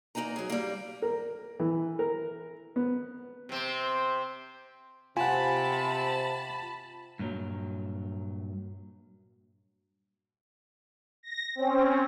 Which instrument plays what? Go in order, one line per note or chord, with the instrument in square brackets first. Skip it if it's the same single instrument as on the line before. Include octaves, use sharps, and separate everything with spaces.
[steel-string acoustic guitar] E2 A#3 D#4 G#5 A#5
F#3 G#4
G3 A#3
[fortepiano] A#4
E3
A#4
B3
[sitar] C3 C4
[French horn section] C3 [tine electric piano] F4 [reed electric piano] F#5 G#5 [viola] A5 B5
[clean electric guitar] G2 A#2 F#3
[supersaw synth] A#6
C4 C#4